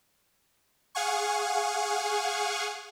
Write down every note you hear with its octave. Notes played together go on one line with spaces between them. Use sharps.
G#4 F5 F#5 G#5 C#6